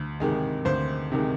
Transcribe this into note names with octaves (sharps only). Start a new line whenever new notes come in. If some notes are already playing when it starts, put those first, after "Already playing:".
Already playing: D2
C3 D#3 G#3
D2 C5
C3 D#3 G#3